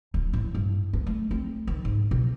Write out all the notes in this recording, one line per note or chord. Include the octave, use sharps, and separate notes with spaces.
D1
A1
G2
B3
A3
C4
D#3
G#2
B2